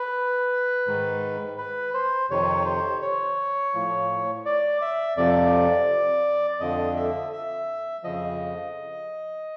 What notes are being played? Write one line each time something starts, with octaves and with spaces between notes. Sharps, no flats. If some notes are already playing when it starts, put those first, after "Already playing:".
Already playing: B4
G#2 D#3
B4
C5
F2 C3 D#3 C#5
C5
C#5
A2 F3
D5
E5
F2 C3 F3 D5
F2 D3 F3 D#5
E5
E5
F2 C#3 F3 D#5